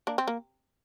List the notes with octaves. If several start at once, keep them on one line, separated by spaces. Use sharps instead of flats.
A#3 D4
C4
A#3